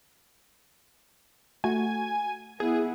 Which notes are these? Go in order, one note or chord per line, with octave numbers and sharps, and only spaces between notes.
A3 F#4 G#5
B3 E4 G#4